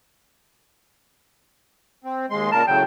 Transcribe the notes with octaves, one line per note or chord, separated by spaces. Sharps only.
C4
D#2 G#3 C6
A#2 C#3 A#4 A5
A2 C#3 F#3 G5